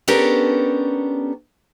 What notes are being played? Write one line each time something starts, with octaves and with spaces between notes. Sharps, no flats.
B3 C#4 D4 G4 A4 A#4